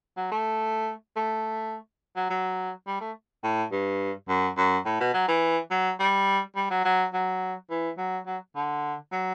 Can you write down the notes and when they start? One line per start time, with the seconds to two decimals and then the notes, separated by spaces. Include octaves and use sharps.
0.17 F#3
0.31 A3
1.16 A3
2.16 F#3
2.30 F#3
2.87 G3
3.01 A3
3.44 A2
3.72 G2
4.29 F#2
4.57 F#2
4.85 A2
5.00 B2
5.14 F#3
5.28 E3
5.71 F#3
6.00 G3
6.56 G3
6.70 F#3
6.85 F#3
7.13 F#3
7.70 E3
7.98 F#3
8.27 F#3
8.55 D3
9.12 F#3